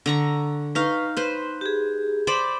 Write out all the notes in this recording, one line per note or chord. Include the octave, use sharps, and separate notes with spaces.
D3 A#5 C#6
D#4 B4 F5 C#6
B4 C5 C6
G4 G#4
C5 D5 B5